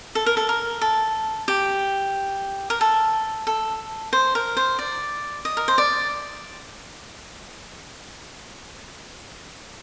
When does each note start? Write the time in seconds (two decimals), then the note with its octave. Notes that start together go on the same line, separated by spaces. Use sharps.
0.15 A4
0.26 A#4
0.37 A4
0.49 A#4
0.81 A4
1.48 G4
2.70 A#4
2.81 A4
3.47 A4
4.13 C5
4.35 A#4
4.57 C5
4.79 D5
5.45 D#5
5.57 A#4
5.68 C5
5.78 D5